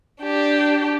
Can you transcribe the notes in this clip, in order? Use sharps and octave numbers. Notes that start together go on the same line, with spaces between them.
D4 G4